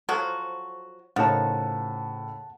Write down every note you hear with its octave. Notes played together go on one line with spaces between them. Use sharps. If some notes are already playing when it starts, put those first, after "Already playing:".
F3 F#3 F#4 A4 C5
A2 C#3 F3 D#4 A#4 C#5 F#5 A5